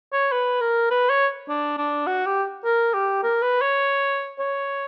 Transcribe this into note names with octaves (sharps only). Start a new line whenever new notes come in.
C#5
B4
A#4
B4
C#5
D4
D4
F#4
G4
A#4
G4
A#4
B4
C#5
C#5